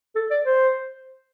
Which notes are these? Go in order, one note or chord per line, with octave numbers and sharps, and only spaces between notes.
A4
D5
C5